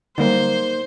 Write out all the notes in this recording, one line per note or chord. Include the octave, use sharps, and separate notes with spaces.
D3 F#3 G3 A#3 D#4 C5